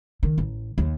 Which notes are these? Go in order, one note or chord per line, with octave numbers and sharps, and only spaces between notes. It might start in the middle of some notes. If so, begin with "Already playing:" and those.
D#3
A1
D#2